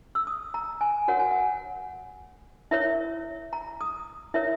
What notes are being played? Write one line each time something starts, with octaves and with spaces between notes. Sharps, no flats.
E6
D#6
A#5
G#5
F#4 A#4 C#5 F#5
G#5
F#5
E4 A#4 C#5 E5
A#5
D#6
E4 A#4 C#5 E5